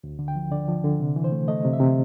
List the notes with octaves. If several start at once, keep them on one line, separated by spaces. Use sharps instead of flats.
D2
D3
G5
F3
D3 D5
F3
D3
C3
E3
C5
A3
A3 D#5
C3
E5
C3